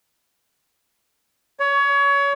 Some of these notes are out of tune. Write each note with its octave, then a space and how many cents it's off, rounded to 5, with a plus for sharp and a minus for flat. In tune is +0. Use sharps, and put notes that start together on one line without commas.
C#5 +25